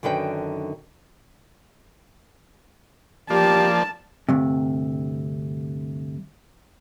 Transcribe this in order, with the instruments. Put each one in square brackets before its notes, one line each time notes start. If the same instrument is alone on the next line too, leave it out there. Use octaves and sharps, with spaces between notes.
[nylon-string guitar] F#2 D3 D#3 A4 B4 G5
[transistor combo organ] F3 A#3 D5 [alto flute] G4 [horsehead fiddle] A5
[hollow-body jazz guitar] D2 G2 C3